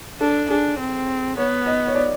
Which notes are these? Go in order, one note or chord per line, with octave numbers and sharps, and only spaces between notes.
D4 A4
D4 G#4
C4
B3 C#5
D#5
C#5
D5